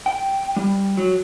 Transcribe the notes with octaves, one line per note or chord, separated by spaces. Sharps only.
G5
G3
F#3